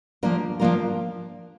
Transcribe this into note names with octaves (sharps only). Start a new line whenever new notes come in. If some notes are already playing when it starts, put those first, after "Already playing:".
F3 A#3 D4 F4 A#4
F3 A#3 D4 F4 A#4